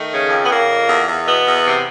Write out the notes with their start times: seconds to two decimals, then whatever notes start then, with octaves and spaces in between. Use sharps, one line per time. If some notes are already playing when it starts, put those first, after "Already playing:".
Already playing: D#3 A3
0.10 C#3
0.29 F2
0.43 B3
0.48 C#3 A#3
0.69 F2
0.87 E2
1.07 E2
1.26 B2 B3
1.46 E2
1.65 C3